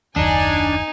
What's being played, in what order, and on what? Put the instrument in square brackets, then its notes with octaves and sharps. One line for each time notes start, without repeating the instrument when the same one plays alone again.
[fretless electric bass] F#1 D#2 [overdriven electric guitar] D4 [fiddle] D#4 [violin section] G#5